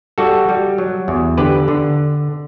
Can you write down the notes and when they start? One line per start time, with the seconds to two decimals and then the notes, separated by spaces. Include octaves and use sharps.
0.18 G3 F#4 A4
0.49 G3
0.78 F#3
1.08 E2
1.38 D3 G4 B4
1.68 D3